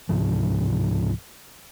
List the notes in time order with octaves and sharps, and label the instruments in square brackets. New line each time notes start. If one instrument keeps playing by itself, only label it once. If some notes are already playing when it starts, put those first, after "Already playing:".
[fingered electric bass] C#2 G#2 C3 F3